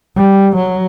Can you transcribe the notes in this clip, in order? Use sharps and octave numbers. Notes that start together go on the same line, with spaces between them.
G3
F#3